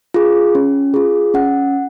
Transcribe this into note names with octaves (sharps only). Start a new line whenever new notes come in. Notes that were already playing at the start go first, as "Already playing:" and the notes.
F4 G#4
C#4
F4 G#4
C#4 F#5